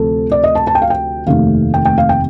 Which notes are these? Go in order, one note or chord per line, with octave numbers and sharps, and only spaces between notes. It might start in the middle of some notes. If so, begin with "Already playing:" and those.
Already playing: D2 C3 F3 A4
D5
D#5
A5
A5
G5
F5
G5
F1 D#2 D#3 A3 C4 F5
G5
G5
F5
G5